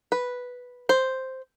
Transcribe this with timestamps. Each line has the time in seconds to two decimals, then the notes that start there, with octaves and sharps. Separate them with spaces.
0.12 B4
0.89 C5